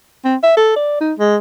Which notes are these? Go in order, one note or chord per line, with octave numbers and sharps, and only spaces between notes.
C4
E5
A4
D5
D#4
G#3